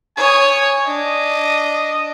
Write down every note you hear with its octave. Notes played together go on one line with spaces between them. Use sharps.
C#5 G#5 D#6
D4 D#5